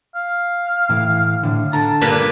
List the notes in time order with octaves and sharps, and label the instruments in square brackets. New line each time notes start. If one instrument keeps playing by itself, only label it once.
[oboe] F5
[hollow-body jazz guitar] A2 E3
A2 D3
[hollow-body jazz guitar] D3 A#5 [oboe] A5
[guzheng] G2 A#2 B4